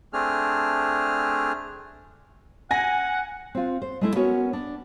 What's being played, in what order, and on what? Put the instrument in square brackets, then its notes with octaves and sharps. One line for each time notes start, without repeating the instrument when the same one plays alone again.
[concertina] A3 C4 D4 G#4 F6
[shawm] F#5 [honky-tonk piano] G#5 A#6
[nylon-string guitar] C4 F4
C5
G#3 A3 E4
B3 C#4 F#4 A#4 C#5
D4